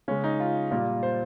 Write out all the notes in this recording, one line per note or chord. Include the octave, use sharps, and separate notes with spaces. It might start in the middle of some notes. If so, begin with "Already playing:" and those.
C#3 G#3 C#4
D#4
F4
A#2 G3 A#3
C5